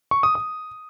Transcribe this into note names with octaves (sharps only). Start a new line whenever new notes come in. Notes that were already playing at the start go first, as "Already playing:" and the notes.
C#6
D#6
D#6